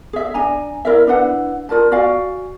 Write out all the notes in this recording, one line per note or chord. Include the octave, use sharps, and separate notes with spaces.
G#4 E5
D4 G#5 A#5
E4 A#4 D5 E5
D4 E4 B4 F#5
F4 A#4 D5 A5
F#4 D5 F5 G#5